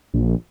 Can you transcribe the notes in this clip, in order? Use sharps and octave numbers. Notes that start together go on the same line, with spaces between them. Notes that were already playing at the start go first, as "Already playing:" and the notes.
A#1